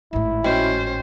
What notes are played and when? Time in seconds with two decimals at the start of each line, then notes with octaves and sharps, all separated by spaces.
0.13 G#1 A2 E4
0.44 C#4 F#4 C5 D#5 G5